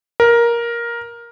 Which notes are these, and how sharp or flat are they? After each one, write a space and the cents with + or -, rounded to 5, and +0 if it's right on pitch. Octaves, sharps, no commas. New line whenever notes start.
A#4 +10